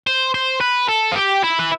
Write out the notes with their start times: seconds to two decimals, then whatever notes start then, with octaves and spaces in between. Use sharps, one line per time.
0.07 C5
0.34 C5
0.61 B4
0.88 A4
1.12 F4
1.16 G4
1.43 E4
1.59 B4